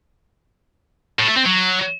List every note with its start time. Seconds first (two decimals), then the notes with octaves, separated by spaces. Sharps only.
1.19 A2
1.28 A3
1.37 C4
1.46 F#3